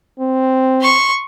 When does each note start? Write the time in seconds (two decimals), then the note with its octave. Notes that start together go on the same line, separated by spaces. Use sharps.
0.20 C4
0.81 C6 C#6